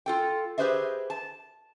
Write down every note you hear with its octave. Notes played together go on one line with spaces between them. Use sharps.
F4 A4 G5
G4 G#4 B4 C5 D#5 E5
A5